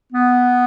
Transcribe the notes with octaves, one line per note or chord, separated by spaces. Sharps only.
B3